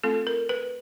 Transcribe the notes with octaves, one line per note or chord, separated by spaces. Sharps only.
A3 C4 F4 A4
A#4
B4